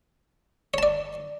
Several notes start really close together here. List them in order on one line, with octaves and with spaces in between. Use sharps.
C#5 A5 D5